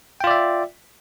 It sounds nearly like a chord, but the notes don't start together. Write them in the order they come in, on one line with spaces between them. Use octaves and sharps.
G5 F4 D5 E5